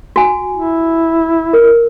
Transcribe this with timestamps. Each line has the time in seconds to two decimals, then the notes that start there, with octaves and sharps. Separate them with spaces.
0.16 F#4 G#5
0.54 E4
1.53 A#4